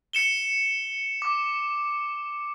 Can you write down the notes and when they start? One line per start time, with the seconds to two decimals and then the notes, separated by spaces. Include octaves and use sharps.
0.13 C#7 E7 G7
1.22 D6